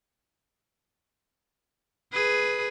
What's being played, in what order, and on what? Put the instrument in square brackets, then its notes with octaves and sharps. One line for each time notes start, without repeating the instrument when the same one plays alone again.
[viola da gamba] G#4 B4